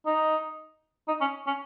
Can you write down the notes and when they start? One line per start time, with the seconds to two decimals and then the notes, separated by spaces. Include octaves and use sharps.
0.06 D#4
1.08 D#4
1.20 C#4
1.47 C#4